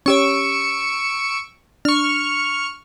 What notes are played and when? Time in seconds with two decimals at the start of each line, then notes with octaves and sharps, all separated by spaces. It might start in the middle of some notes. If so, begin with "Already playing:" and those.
0.06 C#4 G4 C#5 C#6 E6 D7
1.85 D4 C#6 F6